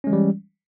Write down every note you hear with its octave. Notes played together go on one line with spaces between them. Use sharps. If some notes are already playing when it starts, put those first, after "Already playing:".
E3 G3 G#3 C#4